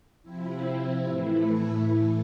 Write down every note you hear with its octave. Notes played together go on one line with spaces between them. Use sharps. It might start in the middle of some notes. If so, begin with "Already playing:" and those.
C3 F3 C4 E4
A2 E3 A3 E4
A2 E3 A3